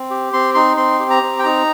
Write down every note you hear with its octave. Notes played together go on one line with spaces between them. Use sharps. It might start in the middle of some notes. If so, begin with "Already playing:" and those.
Already playing: C4
G4
C4 C6
D#4 C6
C4 C6
G4
A#5
C4
G5
D#4 A#5